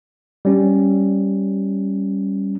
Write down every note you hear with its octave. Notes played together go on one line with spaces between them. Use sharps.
G3 C#4